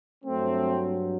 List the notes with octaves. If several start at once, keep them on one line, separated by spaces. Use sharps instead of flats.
G2 F#3 A3 C4